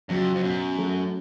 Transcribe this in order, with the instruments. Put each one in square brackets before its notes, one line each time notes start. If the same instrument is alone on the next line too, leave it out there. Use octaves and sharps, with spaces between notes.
[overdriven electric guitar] F2 [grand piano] C#3 F#3
[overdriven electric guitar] F2
[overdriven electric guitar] F#2 [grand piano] B2
[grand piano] F#3 A3